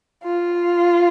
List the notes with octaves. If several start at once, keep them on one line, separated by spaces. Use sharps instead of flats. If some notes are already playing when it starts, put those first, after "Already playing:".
F4